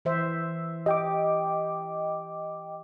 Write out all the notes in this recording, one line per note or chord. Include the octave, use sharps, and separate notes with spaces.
E3 C5 E5
G4 D#5 G5 D6